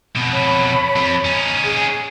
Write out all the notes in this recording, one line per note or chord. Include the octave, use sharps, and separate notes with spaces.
F2 B2
C#5 A5 B5
F2
C#4 D#4
G#4